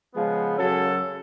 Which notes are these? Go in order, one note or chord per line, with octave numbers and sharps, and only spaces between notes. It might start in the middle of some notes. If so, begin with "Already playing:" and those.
C#3 F3 G#3 B3
F#2 C#3 F#3 C#4 A4